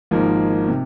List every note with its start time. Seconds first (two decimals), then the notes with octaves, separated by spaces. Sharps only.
0.11 G#1 G#2 F3 A#3
0.68 C3